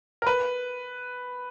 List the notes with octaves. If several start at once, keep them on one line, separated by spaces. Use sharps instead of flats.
A#4
B4